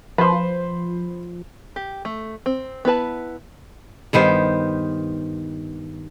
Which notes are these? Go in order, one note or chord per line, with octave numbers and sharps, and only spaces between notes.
F3 B4 C5
G4
A3
C4
B3 E4 B4 A5
G2 D#3 B3 C5